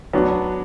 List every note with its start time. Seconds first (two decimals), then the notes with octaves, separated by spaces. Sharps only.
0.13 F#3 B3 D4